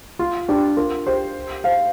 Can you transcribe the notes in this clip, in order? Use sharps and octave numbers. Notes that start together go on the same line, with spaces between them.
F4
D4 G4
F4 A#4
G4 C5
C5 F5